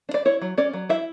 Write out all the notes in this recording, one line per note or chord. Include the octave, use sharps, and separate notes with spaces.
D4
D5
E4 C#5
F#3
C#4 D5
F#3
E4 E5